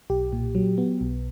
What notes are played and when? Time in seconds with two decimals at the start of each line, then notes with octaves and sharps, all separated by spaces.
0.10 B1 G4
0.32 A#2
0.55 F#3
0.78 B3
1.01 B1